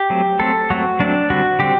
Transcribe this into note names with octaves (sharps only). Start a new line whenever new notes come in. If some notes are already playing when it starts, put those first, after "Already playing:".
Already playing: G4
F#3 A3 C4
F#3 A3 C4 A4
F#3 A3 C4 F#4
F#3 A3 C4 D4
D3 G3 C4 F#4
D3 G3 C4 G4